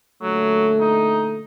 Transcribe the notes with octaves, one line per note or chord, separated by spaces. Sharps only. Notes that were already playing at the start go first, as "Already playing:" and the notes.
A#2 D3 F#3 A3
D#4